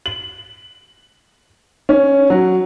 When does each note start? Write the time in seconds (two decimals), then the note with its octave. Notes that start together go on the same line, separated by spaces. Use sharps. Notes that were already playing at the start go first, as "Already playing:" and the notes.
0.06 F#7
1.89 C#4
2.30 F#3